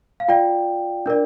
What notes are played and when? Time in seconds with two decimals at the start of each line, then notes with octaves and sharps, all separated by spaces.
0.20 F5
0.28 F4 D5 G5
1.06 D4 A#4 D5